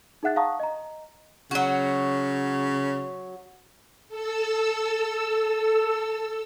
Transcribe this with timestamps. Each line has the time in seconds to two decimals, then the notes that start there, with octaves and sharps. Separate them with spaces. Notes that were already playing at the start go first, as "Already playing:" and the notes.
0.23 D#4 G#4 E5 F#5 F#6 A6
0.36 F5 F#5 A5 A#5 C#6 D#6
0.60 D#5 A#5
1.51 C#3 F#3 F#4
4.08 A4 E6